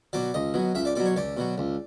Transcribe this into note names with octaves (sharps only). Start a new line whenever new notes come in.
B2 F#3 D5
C#2 D#5
B2 F#3
C#2 E5
D5
B2 F#3 D5
C#5
C#2 D5
B2 F#3
C#2